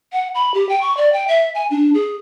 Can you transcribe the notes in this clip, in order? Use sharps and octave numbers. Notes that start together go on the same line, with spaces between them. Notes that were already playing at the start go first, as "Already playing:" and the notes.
F#5
B5
G4
G5
C#6
D5
G5
E5
G#5
D4
G#4